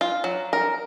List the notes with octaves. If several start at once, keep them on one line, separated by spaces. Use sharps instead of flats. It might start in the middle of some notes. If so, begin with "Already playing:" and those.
F4
F#3
A#4